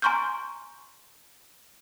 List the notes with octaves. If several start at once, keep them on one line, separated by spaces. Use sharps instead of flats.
G#5 A#5 C6 C#6 F6 G6